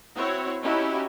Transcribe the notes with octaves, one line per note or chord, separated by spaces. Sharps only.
C4 E4 F#4 C#5
C#4 D#4 E4 F#4 G4